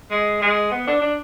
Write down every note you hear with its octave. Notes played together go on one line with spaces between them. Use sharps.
G#3
G#3
B3
D4
D4